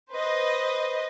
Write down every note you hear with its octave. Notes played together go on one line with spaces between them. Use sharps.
B4 C5 D#5